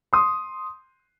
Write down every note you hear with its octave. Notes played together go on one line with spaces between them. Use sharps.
C6 D#6